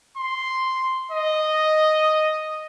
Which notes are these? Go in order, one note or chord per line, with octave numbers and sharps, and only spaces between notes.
C6
D#5